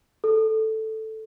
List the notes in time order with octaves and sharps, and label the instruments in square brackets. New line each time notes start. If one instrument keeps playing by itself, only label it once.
[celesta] A4